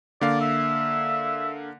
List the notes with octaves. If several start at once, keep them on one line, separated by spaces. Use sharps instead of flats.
D3 A#3 D5 F5
E5